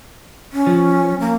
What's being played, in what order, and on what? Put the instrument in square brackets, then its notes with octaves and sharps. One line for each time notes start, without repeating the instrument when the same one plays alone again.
[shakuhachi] C#4
[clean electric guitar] F3
[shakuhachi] A#3